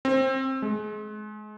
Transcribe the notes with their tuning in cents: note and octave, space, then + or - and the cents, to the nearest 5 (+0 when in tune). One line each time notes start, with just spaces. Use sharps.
C4 +20
G#3 +30